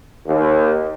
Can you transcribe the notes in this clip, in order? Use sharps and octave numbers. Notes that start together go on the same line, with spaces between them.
D#2